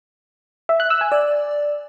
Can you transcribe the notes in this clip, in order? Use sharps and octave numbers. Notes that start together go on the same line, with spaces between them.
E5
F#6
E6
G#5
D5